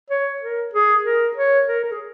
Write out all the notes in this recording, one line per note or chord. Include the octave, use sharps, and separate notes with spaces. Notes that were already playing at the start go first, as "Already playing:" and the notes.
C#5
A#4
G#4
A#4
C#5
A#4
A#4
G#4